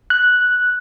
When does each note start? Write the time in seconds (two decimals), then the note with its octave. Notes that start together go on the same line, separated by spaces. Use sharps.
0.10 F#6